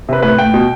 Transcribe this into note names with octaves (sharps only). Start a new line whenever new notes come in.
C3 B4
A2 B4
A2 G5
B2